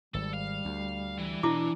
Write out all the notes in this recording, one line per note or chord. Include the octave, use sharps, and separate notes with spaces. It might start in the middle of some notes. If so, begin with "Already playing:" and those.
G#1 G3 A4
F5
D2
E3
B2 D4 E4 D6